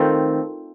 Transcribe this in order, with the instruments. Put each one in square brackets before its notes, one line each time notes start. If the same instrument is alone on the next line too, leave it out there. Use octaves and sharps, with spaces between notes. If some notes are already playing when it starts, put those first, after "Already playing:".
Already playing: [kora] D#3 A3 C4 F4